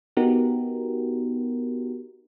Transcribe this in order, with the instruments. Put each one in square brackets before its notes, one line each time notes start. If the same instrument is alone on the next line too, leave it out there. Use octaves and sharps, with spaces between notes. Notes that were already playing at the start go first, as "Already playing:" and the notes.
[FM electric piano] B3 D#4 F#4 G4 A#4